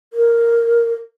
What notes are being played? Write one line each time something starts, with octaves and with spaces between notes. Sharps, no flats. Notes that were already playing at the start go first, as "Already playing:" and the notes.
A#4